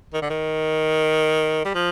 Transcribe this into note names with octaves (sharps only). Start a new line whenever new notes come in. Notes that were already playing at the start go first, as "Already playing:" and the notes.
D#3
D3
D#3
G3
F3